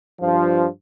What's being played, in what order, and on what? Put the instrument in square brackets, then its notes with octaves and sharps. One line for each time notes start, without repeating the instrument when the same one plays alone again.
[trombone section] G2 F3